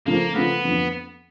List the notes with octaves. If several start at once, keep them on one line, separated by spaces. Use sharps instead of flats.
C#3 F3 A3 A#3 C4 F4
C#3 F3 A3 B3 C4 F4
F2 D3 F3